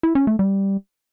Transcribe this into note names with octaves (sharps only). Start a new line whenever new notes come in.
E4
C#4
A3
G3